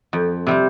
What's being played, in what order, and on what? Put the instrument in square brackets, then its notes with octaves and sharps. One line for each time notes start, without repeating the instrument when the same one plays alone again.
[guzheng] F2
C3 G3 C4